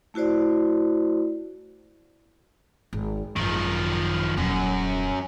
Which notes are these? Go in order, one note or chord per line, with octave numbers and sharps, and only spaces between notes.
A3 E4 F#4 C5 D5
G#1
G#1 F#2 D#3 F3
D#1 F#2